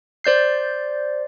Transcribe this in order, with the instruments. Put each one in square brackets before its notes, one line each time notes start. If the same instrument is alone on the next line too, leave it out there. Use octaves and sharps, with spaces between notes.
[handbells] C5 D5 G6 C7